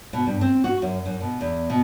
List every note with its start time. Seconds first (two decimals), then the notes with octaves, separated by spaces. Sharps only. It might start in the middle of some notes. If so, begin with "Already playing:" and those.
0.13 B2
0.26 G2
0.41 C4
0.64 F#4
0.82 F#2
1.06 F#2
1.20 B2
1.41 E2
1.70 B2